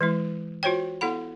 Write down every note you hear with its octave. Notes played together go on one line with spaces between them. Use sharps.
E3 G#3 E4
F4 F#4 C5 C#5 G5
B3 E4 A4 F#5 B5